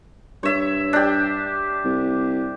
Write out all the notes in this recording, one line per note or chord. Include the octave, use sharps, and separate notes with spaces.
G2 C#5 E5
D4 G4
C2